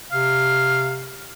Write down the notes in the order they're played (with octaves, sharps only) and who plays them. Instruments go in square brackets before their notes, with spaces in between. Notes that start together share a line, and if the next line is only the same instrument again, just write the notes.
[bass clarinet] C3 [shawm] F5